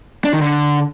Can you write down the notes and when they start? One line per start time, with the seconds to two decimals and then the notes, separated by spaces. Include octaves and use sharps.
0.25 D4
0.33 D#3
0.41 D3